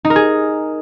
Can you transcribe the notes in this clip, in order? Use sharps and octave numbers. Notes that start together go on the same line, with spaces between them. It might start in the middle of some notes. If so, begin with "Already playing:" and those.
D#4
A#4
G#4